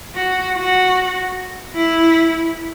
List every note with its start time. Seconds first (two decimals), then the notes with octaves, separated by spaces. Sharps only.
0.15 F#4
0.56 F#4
1.76 E4